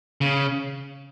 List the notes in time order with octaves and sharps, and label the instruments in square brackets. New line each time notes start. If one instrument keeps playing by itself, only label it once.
[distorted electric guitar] C#3